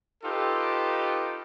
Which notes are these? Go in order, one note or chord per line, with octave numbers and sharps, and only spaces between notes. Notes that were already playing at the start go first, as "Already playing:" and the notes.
D#4 F4 G4 A4 B4